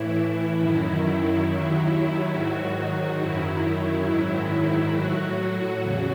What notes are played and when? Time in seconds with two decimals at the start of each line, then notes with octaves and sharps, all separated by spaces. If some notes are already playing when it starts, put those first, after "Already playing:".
Already playing: A2 E3 E4
0.15 E4
0.59 F#2 D#3 F#3
1.02 E4
1.46 D#2 D#3 F#3
2.33 G#2 D#3 F#3 F#4
3.20 F#2 D#3 F#3 E4
4.07 G#2 D#3 F#3 E4
4.94 A2 F#3 F#4
5.81 E2 C#3 F#4